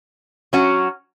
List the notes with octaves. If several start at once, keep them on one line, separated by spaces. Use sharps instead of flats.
F#3 C#4 F#4